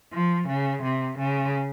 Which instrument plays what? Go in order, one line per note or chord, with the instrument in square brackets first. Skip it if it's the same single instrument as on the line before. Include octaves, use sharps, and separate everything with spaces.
[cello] F3
C#3
C3
C#3